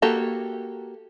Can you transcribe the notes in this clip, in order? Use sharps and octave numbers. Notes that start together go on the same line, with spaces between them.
A#3 F#4 G4 A4